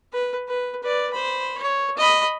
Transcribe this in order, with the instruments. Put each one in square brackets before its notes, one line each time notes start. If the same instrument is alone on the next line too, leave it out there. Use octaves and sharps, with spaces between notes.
[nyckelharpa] B4
B4
B4 D5
C5 B5
C#5
D#5 B5